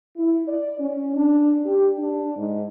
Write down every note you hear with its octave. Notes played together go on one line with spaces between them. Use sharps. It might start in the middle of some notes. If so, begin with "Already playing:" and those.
E4
D5
C#4
D4
G4
D4
G#2